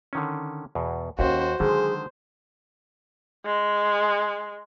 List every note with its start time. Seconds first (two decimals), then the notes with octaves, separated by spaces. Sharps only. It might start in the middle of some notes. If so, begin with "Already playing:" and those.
0.13 D3 D#3 C#4
0.75 E2 B2
1.19 D#2 C#4 F4 F#4 C5
1.60 D3 D#3 F#3 G#3 G#4 C5
3.45 G#3